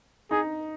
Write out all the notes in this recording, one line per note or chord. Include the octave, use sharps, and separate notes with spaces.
D#4 G#4